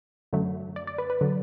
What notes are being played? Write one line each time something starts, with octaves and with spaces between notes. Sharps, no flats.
F#2 D3 F#3 A3
D5
D5
B4
B4
D3 F#3